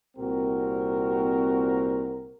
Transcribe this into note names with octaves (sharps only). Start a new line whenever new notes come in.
C2 A#2 C4 F#4 A#4